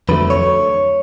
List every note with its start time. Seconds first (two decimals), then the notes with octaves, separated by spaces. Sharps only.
0.09 F2 D3 F#3 A3 B4
0.30 C#5